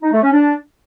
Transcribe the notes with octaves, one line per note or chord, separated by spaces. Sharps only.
D#4
A3
C#4
D4